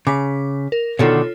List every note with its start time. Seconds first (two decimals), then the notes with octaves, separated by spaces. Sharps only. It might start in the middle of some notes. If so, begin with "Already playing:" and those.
0.07 C#3 D6 B6
0.72 A#4
0.99 B2 D3 D#3 F4 A4 C#5